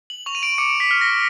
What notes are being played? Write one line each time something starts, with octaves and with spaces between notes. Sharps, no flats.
F#7
C#6 F7
D#7
D7
D6 C#7
B6
F6
A#6